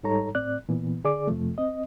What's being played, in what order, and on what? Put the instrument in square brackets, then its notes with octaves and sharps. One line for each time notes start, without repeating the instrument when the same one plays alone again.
[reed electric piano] G#2 G3 D#4 A4 C#5 A#5
A2 C4 D5 F#6
A#2 E3 B3
D3 G#4 D5 D6
F2 C3 F3 A3
C4 D#5